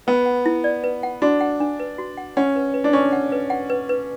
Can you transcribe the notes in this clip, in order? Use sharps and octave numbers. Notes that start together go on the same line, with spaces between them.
B3 B4
F#5
E4
D5
B4
F#5
D4 F#4
F#5
D4
B4
F#4
F#5
C#4 F#5
B4
B4
D4
C#4 C#6
F#5
B4
F#5
B4
B4